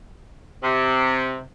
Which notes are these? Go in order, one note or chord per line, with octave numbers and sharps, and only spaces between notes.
C3